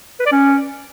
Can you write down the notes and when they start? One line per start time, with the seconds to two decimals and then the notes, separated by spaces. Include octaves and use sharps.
0.20 B4
0.26 D5
0.32 C#4